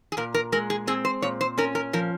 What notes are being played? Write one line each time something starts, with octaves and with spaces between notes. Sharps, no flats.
G#4
A#2 A#4
A#4
G#3 A#4
G#4
C4 G#4
C5
A#2 C#5
C5
C#4 A#4
A#4
F3 A#4